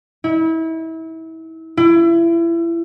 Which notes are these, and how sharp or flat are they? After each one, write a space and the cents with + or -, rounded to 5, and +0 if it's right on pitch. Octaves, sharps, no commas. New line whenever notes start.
E4 -30
E4 +30